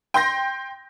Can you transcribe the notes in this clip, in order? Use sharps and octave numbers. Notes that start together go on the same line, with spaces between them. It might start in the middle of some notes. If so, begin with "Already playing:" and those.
G5 C6 G6 A#6